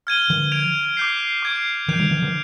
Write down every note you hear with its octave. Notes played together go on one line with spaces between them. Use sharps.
F6 G#6 D#7 G7
D3 F3
G#6 D7 F7
D6 G6 C7
D6 G#6 D7
D3 F3 G6 D7 F7
D#3 G3
D3 F3
D3 F3